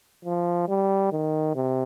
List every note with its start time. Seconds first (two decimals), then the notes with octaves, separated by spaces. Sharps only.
0.25 F3
0.68 G3
1.12 D#3
1.55 C3